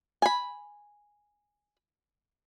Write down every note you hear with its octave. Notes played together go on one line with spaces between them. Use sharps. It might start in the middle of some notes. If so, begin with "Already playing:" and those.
G#5 B5